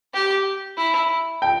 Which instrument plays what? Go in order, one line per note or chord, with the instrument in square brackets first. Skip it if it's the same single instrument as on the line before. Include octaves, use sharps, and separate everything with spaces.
[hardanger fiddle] G4
E4
[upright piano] G5